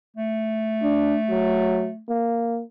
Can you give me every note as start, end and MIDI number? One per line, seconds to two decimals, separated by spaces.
0.17 2.01 57
0.83 1.17 62
1.30 1.89 54
2.09 2.63 58